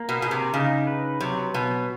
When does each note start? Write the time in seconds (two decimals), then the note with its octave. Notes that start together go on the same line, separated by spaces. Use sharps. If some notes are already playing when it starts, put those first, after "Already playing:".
Already playing: A#3
0.09 B2
0.21 B2 G#4
0.31 C3
0.54 C#3 D#4
0.87 B4
1.20 C3 F#3
1.54 B2 B3